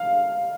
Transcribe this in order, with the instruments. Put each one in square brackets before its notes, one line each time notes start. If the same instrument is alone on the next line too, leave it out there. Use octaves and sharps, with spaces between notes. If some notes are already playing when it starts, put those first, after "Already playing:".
Already playing: [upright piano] F5